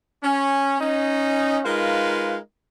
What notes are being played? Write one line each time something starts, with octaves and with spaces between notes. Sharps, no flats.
C#4
C#4 D#4
G#3 D#4 F4 A#4 B4 F5